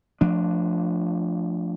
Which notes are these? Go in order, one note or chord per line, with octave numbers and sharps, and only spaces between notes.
F3 A3 D4